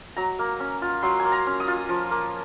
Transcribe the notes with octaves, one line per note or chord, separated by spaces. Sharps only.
F#3 A#5
A#3
C#4
F4
F#3 C6
A#3 G#5
A#5
C#4
D#6
F4
F3
A#3